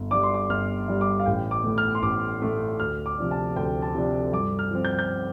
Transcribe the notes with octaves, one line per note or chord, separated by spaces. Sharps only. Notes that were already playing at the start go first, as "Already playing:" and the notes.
Already playing: G1
G2 G3 D4 D6
C6
D6
G1 F6
G2 G3 D4
D6
F5
A1 G5
D6
A2 A3
F6
C6
A1 D6
A2 A3
D2 F6
D6
C3 F3 D4
A5
D2 G5
A5
C3 F3 D4
G2 D6
F6
F3 C4
G6
G6